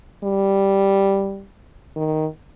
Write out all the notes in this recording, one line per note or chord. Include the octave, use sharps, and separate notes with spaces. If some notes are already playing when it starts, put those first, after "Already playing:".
G3
D#3